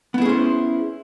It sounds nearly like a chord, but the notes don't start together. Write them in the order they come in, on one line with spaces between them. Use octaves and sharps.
B3 E4 G#4 C#4 C5